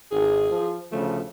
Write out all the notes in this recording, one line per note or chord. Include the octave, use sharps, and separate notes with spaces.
G#1 G#4
F3
D2 C#3 F3 A3